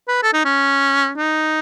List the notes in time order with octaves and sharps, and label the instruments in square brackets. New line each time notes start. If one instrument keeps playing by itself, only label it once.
[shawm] B4
A4
D#4
C#4
D#4